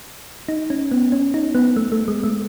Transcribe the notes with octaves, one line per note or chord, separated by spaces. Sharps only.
D#4
C#4
B3
C#4
D#4
B3
A3
A3
G#3
A3